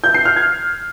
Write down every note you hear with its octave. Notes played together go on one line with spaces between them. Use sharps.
G6
C7
F6
G#6